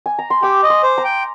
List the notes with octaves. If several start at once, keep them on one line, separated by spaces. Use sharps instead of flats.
G#5
A#5
C6
G4 D6
D#5
C6
C5
A#5
G5